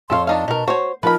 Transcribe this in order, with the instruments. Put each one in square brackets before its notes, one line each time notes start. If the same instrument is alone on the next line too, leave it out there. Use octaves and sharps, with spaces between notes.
[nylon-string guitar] F2 G4 C#5 [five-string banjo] A4 F5 [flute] C6
[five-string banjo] D4 D#4 F5 [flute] A5
[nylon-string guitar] B2 [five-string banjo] D#4 A#4
[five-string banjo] F#4 C#5 [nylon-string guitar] C5
[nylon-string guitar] F3 D#4 [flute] A#4 [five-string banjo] B4 B5